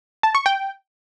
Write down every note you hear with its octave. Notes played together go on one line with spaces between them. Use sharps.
A5
C#6
G5